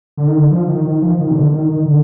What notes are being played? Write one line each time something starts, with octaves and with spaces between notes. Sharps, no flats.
D3
D#3
D3
F3
D#3
D#3
F3
D#3
B2
D3
D#3
D#3
D3